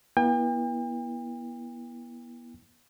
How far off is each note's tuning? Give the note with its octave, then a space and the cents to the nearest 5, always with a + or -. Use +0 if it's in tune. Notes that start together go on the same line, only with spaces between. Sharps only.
B3 -40 E4 +0 G5 +40